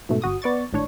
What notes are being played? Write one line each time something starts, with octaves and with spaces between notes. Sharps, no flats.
G#2 B2 A3
G1 F#4 D#6
B3 D5 C#6 A6
G#1 A2 D4 C#5